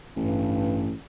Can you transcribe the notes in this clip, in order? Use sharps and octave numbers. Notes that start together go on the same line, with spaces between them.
A1 G2